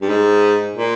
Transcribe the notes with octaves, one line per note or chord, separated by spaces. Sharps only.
G2
G#2
A#2